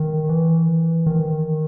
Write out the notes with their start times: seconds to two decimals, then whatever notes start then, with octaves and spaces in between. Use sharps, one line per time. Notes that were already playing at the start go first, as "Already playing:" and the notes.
Already playing: D#3
0.29 E3
1.06 D#3